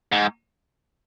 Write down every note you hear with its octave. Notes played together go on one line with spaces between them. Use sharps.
G#2